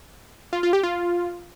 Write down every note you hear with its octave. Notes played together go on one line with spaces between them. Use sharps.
F4
F4
G4
F4